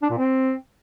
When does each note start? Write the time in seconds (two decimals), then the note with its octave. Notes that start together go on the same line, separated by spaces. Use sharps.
0.02 D4
0.10 A#2
0.18 C4